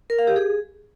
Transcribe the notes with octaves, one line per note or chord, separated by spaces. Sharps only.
A#4
F5
G4
G#4